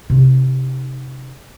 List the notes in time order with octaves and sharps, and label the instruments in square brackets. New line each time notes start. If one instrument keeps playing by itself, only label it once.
[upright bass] C3 D#4